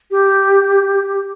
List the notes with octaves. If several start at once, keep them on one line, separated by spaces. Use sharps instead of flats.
G4